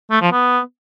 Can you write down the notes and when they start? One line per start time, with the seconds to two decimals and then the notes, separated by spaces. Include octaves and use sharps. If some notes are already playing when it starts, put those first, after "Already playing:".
0.11 A3
0.21 F3
0.32 B3